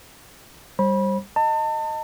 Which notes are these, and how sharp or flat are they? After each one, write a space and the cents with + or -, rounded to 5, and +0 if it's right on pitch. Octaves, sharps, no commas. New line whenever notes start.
G3 +0 C5 +35 B5 -25
D#5 +0 A5 +35